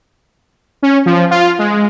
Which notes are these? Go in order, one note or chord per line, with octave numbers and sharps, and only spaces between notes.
C#4
F3
F4
G#3